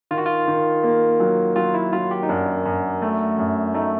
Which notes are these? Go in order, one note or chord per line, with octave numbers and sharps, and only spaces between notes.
D#3 F4
F#4
F4
D#3
A#3
F#3
F#3 F4
E4
F#3 F4
G4
D#4
F#2 D4
F#2
A3
F#2
A3 D#4